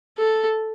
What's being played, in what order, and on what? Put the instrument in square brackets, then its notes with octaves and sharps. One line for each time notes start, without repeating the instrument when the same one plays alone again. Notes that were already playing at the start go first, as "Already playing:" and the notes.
[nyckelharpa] A4